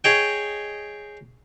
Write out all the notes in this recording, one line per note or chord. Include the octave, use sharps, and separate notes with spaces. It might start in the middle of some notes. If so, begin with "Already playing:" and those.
G#4 C#5 D#5 G5